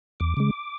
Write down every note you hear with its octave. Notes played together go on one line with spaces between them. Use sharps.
E2 D6
C#3 G#3